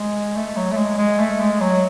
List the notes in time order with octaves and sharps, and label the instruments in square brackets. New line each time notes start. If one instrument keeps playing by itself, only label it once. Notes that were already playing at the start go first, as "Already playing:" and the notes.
Already playing: [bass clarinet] G#3
A3
F#3
A3
G#3
G#3
A3
G#3
F#3